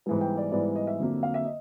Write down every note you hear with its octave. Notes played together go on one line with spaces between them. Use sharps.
G#2 E3 G3 B3
G5
D5
G#2 E3 G3 B3 D5
D#5
E5
F2 D3 F#3 A#3
F5
E5
D#5